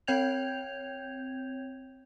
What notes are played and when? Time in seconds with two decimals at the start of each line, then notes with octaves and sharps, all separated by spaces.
0.07 C4 C#5 G5 G6 G#6 F7